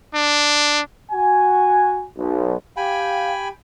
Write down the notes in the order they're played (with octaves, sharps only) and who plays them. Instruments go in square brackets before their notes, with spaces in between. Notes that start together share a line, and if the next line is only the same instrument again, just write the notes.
[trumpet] D4
[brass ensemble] F#4 G#5
B1
[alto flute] G4 [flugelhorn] F5 [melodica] G5 G#5 B5